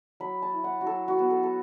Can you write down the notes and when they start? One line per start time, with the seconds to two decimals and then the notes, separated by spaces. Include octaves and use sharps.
0.20 F#3 B5
0.42 A5
0.53 E4
0.64 F#5
0.81 F#4
0.86 F#3 A4
1.08 F#4
1.19 B3
1.30 A4
1.43 A4